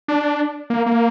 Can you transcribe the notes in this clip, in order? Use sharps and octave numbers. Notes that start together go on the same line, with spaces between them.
D4
A#3
A#3